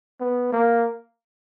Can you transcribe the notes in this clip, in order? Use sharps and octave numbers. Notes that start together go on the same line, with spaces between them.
B3
A#3